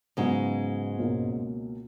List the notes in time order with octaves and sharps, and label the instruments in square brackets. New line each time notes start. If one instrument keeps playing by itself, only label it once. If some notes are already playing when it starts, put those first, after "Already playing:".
[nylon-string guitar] G#2 G#3 [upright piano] C#3 F#3 B3 D#4 F#4
[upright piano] C#2 B2 A#3 C#4